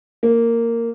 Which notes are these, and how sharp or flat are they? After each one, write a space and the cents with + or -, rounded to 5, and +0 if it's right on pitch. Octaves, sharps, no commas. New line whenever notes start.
A#3 -10